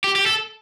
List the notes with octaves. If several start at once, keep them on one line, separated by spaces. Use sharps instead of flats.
G4
G4
A4